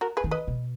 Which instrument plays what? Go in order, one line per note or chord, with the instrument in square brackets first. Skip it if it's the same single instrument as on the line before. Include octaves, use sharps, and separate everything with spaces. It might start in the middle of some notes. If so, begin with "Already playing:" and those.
[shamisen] F#4 A#4
G#4 B4
[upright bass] D#3
[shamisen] B4 D#5
[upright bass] B2